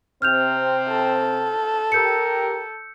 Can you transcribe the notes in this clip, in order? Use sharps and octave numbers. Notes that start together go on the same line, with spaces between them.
C3 C4 F6 G6 F7
A4
G4 A#4 E6 G6 C#7